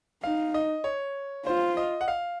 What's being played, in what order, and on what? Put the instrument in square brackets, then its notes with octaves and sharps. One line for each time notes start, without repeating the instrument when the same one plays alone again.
[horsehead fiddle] D#4 [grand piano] F5
[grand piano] D#5
C#5
[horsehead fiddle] F4 [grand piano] C5
[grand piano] D#5
F#5
F5